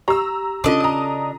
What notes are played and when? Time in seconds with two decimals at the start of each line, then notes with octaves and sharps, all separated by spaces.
0.08 G4 A#5 C#6 E6
0.64 C#3 D4 F4 A4 D#5 D6
0.80 A#5 D#6